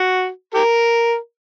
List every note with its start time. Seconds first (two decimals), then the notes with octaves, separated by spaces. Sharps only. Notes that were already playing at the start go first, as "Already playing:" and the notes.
Already playing: F#4
0.55 G4 A#4